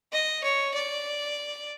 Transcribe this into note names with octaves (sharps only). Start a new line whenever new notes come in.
D#5
C#5
D5